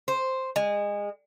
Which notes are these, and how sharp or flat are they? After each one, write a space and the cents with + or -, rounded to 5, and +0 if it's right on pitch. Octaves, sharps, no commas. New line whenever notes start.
C5 +0
G#3 -25